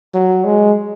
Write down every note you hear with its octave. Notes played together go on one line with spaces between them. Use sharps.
F#3
G#3